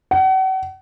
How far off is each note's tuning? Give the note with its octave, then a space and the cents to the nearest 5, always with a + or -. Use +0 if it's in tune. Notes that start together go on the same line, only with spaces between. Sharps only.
F#5 +40